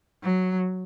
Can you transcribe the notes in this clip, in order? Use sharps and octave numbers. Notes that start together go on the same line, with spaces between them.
F#3